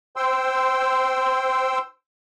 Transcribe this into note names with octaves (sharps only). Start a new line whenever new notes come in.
C5 G5 C6 E6